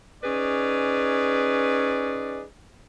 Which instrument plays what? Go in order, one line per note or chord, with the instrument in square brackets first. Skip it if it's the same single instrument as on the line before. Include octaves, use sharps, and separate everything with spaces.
[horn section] C#4 D#4 G#4 B4 D5